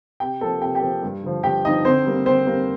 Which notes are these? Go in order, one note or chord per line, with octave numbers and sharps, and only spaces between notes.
C3 G4 G5
F3 A#3 A4 A5
C3 G4 G5
G4 G5
F3 A#3
G2
D3 F3
G2 G4 G5
D3 F3 D#4 D#5
D3 C4 C5
G3 A#3
D3 C4 C5
G3 A#3